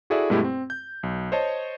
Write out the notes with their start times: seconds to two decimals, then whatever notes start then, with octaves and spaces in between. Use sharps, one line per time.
0.10 E4 F#4 G#4 A4 D5 E5
0.30 G2 B2 G#3 A3 E4 G4
0.44 C4
0.70 G6
1.03 B1
1.32 C5 C#5 D#5 A5